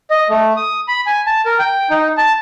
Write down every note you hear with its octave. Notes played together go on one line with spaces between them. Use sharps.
D#5
A3
D#6
B5
G#5
A5
A#4
G5
D#4
A5